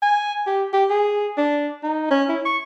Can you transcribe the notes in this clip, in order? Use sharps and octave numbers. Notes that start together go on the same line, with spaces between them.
G#5
G4
G4
G#4
D4
D#4
C#4
E4
C#6